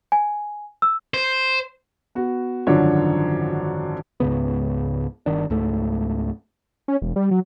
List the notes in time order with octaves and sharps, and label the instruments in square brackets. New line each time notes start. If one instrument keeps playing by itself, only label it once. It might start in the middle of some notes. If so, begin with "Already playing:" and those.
[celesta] G#5
E6
[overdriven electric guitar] C5
[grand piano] B3 F#4
G#1 F#2 D3 F3 D4 C#5
[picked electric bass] C#2 G#2 C#3 B3
G1 D#3 D4
C#2 G#2 A3
[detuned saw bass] C#4
E1
G3
F#3